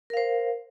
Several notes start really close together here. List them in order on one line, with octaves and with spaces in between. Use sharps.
A#4 F5 C5